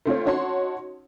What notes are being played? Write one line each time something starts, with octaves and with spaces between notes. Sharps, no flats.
A3 C4 F4 C#5
C#4 D#4 F#4 C#5 A5 C6